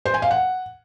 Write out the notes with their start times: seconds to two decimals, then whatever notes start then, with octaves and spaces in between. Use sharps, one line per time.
0.05 C5
0.14 G#5
0.22 F5
0.31 F#5